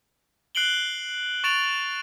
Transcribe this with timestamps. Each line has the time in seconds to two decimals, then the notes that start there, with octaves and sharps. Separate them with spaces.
0.55 F#6 C7 D7 F#7 G7
1.44 C#6 A6 D7 F7